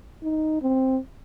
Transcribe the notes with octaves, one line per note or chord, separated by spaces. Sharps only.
D#4
C4